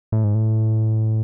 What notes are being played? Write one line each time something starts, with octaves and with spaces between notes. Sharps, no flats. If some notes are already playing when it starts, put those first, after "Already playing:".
A2
G#2
A2